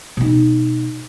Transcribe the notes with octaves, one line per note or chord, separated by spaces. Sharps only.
B2 D#4